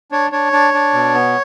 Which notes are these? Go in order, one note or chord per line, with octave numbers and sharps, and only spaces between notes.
D4 C#5
D4 C#5
D4
D4
B2
B3